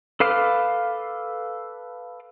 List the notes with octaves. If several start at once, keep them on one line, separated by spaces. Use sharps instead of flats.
A4 B4 F5 D6 F6